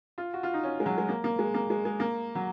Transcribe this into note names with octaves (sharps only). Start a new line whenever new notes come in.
F4
F#4
F4
D#4
C#4
G#3
F#3
G#3
A#3
A#3
G#3
A#3
G#3
G#3
A#3
F#3